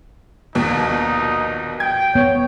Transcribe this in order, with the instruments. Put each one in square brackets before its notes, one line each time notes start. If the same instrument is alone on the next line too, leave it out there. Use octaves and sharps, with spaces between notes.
[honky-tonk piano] A#1 D#2 B2 [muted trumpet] D#4
[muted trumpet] G5 [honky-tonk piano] G#6
[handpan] B3 [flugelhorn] C#5